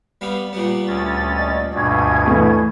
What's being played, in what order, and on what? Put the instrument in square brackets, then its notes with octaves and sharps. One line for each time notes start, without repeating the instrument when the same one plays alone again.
[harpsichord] G3 B3 F5
A#2 G3 B3
[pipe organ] D2 C#4 A6
[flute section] D5 D#5
[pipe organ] D2 G2 B2 [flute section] G#5 C#6 G#6
[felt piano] E3 A3